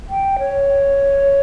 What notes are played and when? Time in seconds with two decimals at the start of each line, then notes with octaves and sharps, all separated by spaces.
0.09 G5
0.39 C#5